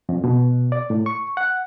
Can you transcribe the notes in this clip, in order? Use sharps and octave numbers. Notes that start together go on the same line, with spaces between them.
F2
B2
D5
A2
C#6
F#5